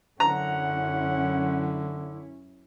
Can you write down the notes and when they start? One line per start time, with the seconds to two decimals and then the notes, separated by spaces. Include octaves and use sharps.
0.20 F#2 D3 C#4 E4 F#5 A#5